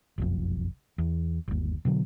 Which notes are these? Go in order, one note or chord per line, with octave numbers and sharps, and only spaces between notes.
F#1 B1 F2
E2
G1 D#2
B2 D3 F#3